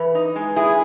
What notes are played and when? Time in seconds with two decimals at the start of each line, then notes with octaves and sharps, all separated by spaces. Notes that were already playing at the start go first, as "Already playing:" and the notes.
Already playing: E3 B4
0.15 D#4
0.36 G#3
0.56 A#2 E4 G#4